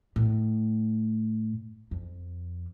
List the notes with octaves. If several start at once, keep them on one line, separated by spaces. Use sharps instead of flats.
A2
F2